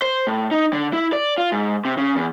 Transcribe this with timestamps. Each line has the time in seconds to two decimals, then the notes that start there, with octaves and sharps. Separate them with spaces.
0.02 C5
0.27 A2
0.51 D#4
0.73 D3
0.93 E4
1.13 D5
1.38 F4
1.52 G#2
1.85 C3
1.97 C#3
2.16 E2